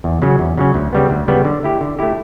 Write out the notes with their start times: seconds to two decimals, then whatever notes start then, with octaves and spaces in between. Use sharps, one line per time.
0.04 E2
0.22 C#3 F#3 C#4
0.39 E2
0.57 C#3 F#3 C#4
0.74 D2
0.93 C#3 G3 B3
1.10 D2
1.28 C#3 G3 B3
1.45 D3
1.63 A3 E4 G4
1.81 D3
1.99 A3 E4 G4